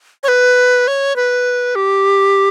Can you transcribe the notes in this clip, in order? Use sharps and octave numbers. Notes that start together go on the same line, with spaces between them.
C#5
B4
C#5
B4
G4